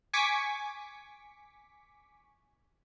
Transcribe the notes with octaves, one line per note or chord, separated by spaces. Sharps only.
G#5 C#6 D6 B6